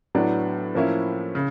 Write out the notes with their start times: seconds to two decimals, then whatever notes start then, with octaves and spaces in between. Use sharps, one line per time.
0.15 A2 F#3 B3 D4
0.75 A2 F3 A#3 C#4 E4
1.35 C#3